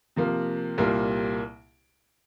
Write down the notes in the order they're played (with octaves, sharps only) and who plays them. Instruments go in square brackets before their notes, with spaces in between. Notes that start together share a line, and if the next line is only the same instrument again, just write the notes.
[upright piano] C3 F3 A#3
C2 A#2 G3 A#3